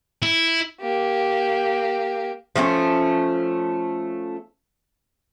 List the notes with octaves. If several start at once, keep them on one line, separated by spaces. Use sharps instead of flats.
E4
A#3 G4
F3 A3 A#3 C#4